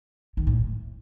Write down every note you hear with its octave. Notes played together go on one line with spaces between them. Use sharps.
D#3
A2